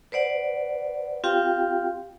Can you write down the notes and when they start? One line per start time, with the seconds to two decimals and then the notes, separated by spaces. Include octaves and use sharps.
0.12 B4 C5 D5 F#5
1.24 C4 F4 G4 F5 G5